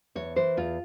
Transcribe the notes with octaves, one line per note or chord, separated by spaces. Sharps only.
E2 C#5
E3 C5
E2 F4